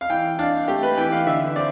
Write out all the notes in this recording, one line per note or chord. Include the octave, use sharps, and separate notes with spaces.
F5
E3 G5
D4 F5
A3 G4
B4
E3 G5
F5
D3 E5
C4 D5